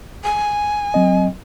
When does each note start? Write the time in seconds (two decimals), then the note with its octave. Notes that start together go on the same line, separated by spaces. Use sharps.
0.24 G#5
0.94 F#3 C4 D#5